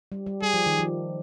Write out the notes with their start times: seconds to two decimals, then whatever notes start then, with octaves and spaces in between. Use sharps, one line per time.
0.12 G3
0.26 G3
0.41 G3 G#4
0.54 F3
0.66 D#3
0.79 F3